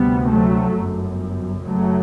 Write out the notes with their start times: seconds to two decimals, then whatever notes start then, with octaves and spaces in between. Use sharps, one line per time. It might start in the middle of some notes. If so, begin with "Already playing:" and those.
Already playing: D2 C3 G3 B3
0.30 F#3 A3
0.76 G1 F#2
1.63 F#1 F#2 F#3 A3